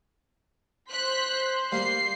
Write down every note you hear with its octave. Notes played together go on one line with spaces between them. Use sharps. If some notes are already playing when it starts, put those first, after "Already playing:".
C5 F#6 B6
G3 A#3 C7